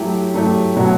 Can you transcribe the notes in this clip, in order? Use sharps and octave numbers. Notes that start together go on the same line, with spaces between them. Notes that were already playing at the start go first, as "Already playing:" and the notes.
Already playing: F#3 A3 E4 G4
F#3 A3 E4 G4
B2 F#3 A3 C#4 F#4